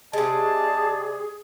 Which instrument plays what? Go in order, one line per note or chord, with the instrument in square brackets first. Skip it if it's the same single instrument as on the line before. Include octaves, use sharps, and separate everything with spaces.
[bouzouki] C3 G#3 [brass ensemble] G4 D5 [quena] G#4 [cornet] A5